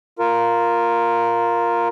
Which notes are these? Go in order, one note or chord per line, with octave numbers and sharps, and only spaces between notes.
F4 A#4